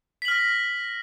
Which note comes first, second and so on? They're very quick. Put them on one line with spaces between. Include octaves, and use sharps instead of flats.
B6 F#7 F6 A#6